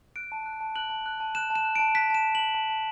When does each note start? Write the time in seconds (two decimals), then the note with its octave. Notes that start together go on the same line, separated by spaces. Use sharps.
0.16 F#6 D7
0.32 A5
0.46 F#6
0.61 A5
0.76 F#6 F#7
0.90 A5
1.06 F#6
1.20 A5
1.35 F#6 E7
1.50 A5
1.55 E7
1.65 F#6
1.75 A5 D7
1.95 F#6 B6
2.10 A5 E7
2.25 F#6
2.35 A5 F#7
2.55 A5
2.70 A5